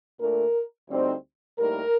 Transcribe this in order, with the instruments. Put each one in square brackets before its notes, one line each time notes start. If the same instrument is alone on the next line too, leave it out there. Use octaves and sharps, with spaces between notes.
[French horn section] A#2 A3 D4 A#4
D2 D3 G3 C4 D#4
A2 G3 A#3 D#4 A#4